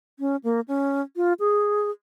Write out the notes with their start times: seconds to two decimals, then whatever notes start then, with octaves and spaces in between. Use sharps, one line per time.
0.19 C#4
0.44 A#3
0.68 C#4
1.16 F4
1.40 G#4